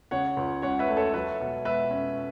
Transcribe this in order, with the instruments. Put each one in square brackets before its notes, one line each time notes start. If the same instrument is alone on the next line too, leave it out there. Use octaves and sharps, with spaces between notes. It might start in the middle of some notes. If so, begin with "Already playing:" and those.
[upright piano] C#3 C#5 F#5
C#2
C#4 C#5 F#5
B4 E5
A3
A4 C#5
F#3 B4 E5
B2
B2 B4 E5
C#4